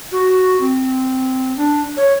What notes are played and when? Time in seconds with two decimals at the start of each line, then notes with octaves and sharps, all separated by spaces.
0.12 F#4
0.60 C4
1.57 D4
1.97 C#5